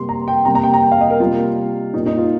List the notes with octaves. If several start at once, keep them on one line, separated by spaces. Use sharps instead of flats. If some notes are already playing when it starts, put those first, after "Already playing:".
Already playing: C3 G3 A#3 C6
A#5
G5
C3 G3 A#3 A#5
A#5
G5
A#5
G5
F5
D#5
A#4
C3 G3 A#3 F4
A#2 A#3 D#4
D#4
F4